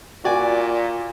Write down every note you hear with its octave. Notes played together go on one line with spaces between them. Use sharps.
A#2 F#4 D5 G#5